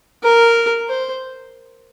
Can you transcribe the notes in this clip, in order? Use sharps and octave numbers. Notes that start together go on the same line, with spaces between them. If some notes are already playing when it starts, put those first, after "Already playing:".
A#4
C5